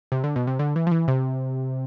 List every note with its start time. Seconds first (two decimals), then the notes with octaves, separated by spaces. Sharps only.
0.12 C3
0.24 D3
0.36 B2
0.47 C3
0.59 D3
0.76 E3
0.87 F3
0.91 E3
1.08 C3